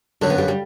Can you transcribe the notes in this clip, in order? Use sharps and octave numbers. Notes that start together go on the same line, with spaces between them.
F#2 D3 F#3 A3
B3
G3
G3